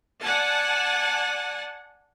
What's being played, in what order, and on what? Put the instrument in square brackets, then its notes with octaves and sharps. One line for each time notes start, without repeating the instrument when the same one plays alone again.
[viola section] D5 F#5 G#5 A5